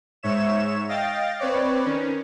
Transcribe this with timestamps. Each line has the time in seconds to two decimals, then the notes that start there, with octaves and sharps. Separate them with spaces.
0.23 G#2 C#5 E5 E7
0.89 D#5 F5 G5 A6
1.39 C4 B4 C#5 D5
1.85 D#3 C#4